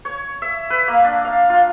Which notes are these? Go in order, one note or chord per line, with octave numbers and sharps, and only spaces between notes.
C#5
E5
B4
A#3
D4
F5
F4